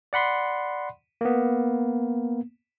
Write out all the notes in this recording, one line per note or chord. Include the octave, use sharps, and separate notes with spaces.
D5 F#5 B5 C6
A#3 B3